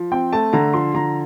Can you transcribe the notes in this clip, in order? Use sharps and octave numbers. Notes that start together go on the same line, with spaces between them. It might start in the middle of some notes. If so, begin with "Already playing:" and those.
Already playing: F3
C4 G5
A3 A5
D3 A#5
F3 C6
D3 A#5